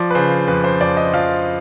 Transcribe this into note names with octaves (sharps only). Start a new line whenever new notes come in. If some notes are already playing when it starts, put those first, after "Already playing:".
Already playing: F3 D5
B4
C#3 C5
F2 B4
C5
F2 D5
D#5
F3 F5